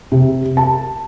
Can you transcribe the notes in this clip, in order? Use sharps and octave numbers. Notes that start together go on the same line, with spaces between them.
C3
A5